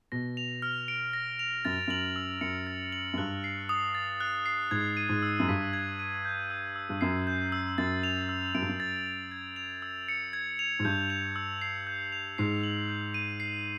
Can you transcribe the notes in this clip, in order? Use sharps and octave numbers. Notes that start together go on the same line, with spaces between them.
B2 A#6
F7
F6
D7
A#6
F7
F#2 A6
F#2 F#7
E6
F#2 C#7
A6
F#7
F#2
G2 F#6
C7
D#6
A6
F#6
C7
G#2 G#6
D#7
G#2
E6
F#2
G2 B6
G#6
D#7
G6
E6
E6
G2
F#2 C7
G6
E6
F#2 A6
F7
E6
F#2 D7
G2
F#2
A6
F7
G#6
F7
E6
C#7
G#6
F7
G#2
G2 G6
F7
E6
C7
G6
F7
G#2 C7
F#7
G6
D#7
C7